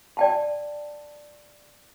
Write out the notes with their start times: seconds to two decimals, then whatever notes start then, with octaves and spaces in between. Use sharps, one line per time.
0.17 D5 G5 A5